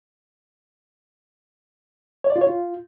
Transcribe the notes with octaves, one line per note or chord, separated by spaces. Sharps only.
C#5
D5
F4
C#5
F4